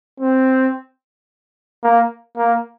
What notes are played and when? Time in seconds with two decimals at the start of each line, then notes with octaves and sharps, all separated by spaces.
0.20 C4
1.84 A#3
2.37 A#3